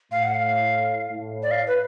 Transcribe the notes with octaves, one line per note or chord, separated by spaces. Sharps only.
A2 F5
F#5
F5
A2
D5
F5
B4